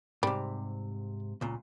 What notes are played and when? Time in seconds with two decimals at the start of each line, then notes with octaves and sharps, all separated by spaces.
0.23 G#2 C3 G3
1.41 C#2 A#2